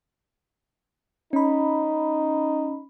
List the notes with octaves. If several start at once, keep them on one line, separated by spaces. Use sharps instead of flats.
C#4 D#4 B5